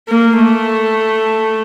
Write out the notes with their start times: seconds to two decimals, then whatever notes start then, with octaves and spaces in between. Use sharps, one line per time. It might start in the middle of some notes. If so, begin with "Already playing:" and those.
0.09 A#3
0.38 A3